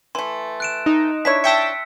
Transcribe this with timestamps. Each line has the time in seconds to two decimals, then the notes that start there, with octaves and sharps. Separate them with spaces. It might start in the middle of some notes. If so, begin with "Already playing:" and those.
0.15 E3 A3 C6
0.60 F#6 D7 E7
0.86 D#4
1.25 D4 E4 C#5 B6
1.44 E5 G5 A5 E6 B6 C#7